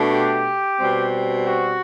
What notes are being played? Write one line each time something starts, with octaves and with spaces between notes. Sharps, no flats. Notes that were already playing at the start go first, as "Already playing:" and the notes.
Already playing: B2 A3 D4
G4
B2 G3 C4
F#4